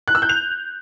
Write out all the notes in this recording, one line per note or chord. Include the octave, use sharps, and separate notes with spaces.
F#6
E6
G6
F7